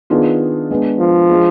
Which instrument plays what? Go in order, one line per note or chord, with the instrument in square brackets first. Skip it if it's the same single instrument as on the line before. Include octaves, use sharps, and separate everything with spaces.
[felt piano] D#3 B3 D4 F4 G#4
G#3 B3 D4
[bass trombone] F3
[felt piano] G#3 D4 G#4